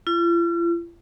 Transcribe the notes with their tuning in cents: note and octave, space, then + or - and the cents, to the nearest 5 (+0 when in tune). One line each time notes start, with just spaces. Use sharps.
F4 -45